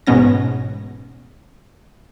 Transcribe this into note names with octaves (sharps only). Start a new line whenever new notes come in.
A1 G#2 B2 B3 C#4 A#6